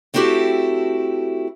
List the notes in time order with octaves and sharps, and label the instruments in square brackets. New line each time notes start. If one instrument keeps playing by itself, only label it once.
[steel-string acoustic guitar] A3 C4 E4 F#4 G4 A4